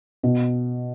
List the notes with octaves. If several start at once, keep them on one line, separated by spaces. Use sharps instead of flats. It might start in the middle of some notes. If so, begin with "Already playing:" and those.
B2